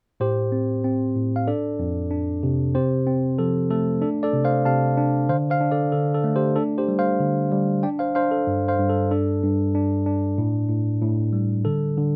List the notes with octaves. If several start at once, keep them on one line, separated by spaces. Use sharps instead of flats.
A2 G4 C5
C4
C4
A2
F5
D4 A4 D5
F2
D4
C3
C4 G4 C5
C4
F3 A4
A3 A4
D4 A4
A4 D5
C3
C5 F5
C3 F5 A5
D4
D3 C5 F5
C5 F5
D4
A4 D5
D3 A4
A4
A3
G4 C5
D4 A4
G4 C5
G3
C5 F5
D3
G3
D4 D5 G5
C5 F5
D4 C5 F5
A4
G2
C5 F5
G2
A4
D4 A4
G2
D4
D4
A2
A2
A2
G3
D3 A4
D3